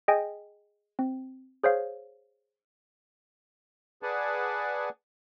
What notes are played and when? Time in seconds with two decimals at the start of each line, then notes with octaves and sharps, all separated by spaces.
0.08 G#4 D#5 G5 G#5
0.99 C4
1.64 G#4 C5 C#5 F5
4.03 G#4 B4 D5 F#5 G#5 A5